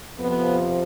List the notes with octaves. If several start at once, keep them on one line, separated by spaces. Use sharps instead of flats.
F2 C3 F3 B3